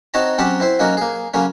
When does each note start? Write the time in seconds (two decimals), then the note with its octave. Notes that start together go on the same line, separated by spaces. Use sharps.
0.14 C4 D#4 F#4 C#5 A5 A#5
0.38 F#3 C4 C#4 G4 F#5 A5
0.60 C4 E4 C5
0.79 F#3 A#3 C#4 D#4 F#4
0.97 A#3 G#4
1.34 C#3 F#3 A#3 C#4